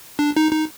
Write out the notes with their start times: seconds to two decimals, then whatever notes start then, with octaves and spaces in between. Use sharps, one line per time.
0.19 D4
0.37 D#4
0.53 D#4